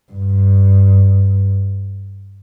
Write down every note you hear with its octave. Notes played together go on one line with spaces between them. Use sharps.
G2